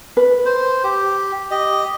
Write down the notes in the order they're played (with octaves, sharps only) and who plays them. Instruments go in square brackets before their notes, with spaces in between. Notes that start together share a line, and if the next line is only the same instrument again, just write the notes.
[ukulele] B4
[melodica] C5
G4
G4 D#5